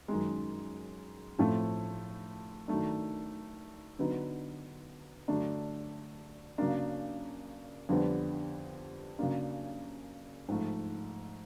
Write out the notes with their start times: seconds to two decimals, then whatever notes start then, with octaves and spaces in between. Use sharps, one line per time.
0.08 F#2 D#3 G#3
1.38 A2 F3 A3 C4
2.68 D#3 F#3 A3 D4
3.99 D3 F#3 B3 D#4
5.28 D3 F#3 A3 D4
6.58 C#3 F#3 A#3 D4
7.89 F2 D3 G3 B3 D4
9.19 C#3 F#3 A#3 D4
10.48 G#2 F3 A3